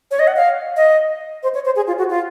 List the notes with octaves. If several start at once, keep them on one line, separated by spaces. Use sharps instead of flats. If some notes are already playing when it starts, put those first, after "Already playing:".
C#5
D#5
F#5
F5
D#5
C5
C#5
C5
G#4
F4
F#4
F4